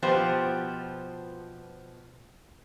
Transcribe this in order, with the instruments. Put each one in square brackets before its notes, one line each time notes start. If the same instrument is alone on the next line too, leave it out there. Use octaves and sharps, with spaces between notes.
[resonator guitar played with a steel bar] B2 F3 B3 F4 G4 C5